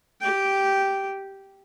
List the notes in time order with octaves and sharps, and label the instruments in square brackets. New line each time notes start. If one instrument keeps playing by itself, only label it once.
[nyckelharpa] G4 G5